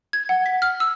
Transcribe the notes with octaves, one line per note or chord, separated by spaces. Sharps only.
G#6
F#5
B6
F6
E6